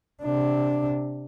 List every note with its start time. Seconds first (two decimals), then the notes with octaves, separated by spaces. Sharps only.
0.23 C3 D4